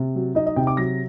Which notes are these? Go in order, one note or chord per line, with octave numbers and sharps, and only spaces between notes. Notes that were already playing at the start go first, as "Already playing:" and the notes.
Already playing: C3
F#3
D#4 D#5
D#5
C3 G5
D6
F#3 A#6